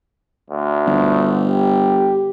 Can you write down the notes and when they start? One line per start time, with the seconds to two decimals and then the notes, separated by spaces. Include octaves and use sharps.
0.50 D2
0.86 G1
1.47 G4